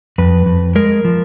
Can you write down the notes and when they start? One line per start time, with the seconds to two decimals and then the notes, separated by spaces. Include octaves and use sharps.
0.18 F2 B4
0.46 F2
0.75 G#3 A#4
1.05 F3